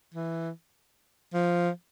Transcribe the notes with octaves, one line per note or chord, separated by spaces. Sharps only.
E3
F3